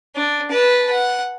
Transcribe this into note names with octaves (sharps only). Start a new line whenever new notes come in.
D4
B4 A5
F#5